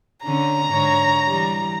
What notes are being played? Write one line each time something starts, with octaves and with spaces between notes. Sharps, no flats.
D3 C#4 A#5
G#2 D3 C#5
E3 G3